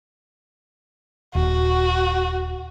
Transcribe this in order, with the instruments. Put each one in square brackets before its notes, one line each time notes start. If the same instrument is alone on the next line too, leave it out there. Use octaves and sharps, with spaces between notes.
[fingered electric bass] D#1 [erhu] F#4